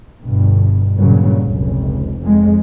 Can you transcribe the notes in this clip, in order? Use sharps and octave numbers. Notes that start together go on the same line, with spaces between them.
G1 G2 B2
G2 A#2 C#3 F#3
F1 C#2
F2 G#3